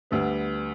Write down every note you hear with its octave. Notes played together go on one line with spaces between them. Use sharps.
D2 D3 G3 B3